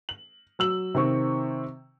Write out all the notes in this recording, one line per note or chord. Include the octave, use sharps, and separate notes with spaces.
F#7
F#3 E6 F#7
C3 D#3 C4 C#6